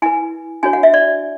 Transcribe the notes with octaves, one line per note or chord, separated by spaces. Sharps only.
E4 B4 G#5
D4 F#4 C#5 G#5
F#5
E5
D5